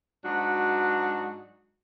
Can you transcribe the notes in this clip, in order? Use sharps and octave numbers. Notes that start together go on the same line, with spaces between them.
G#2 F#3 D4 F#4